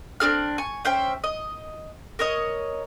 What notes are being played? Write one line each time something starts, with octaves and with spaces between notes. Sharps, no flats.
C4 D4 G#4 F6
G#5 C#6
C#4 C5 E5 G5
D#5
A#4 C#5 D#5